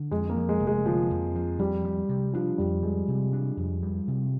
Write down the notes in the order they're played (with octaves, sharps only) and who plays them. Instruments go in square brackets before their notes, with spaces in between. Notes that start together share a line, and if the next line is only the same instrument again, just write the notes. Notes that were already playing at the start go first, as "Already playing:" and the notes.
Already playing: [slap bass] D3
[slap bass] F2 [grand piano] G#3
[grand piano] A#3
[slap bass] F3
[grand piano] G#3
[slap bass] F1
[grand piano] G#3
[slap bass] D3 [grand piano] F3
[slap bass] F2
F3
[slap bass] F2 [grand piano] G3
[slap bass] G3
C3
[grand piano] F3 [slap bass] D4
[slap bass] F2 [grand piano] G3
[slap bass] G3 [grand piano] G#3
[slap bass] C3
D4
F2
G3
C3